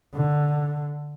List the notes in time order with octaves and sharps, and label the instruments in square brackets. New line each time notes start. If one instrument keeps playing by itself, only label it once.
[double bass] D3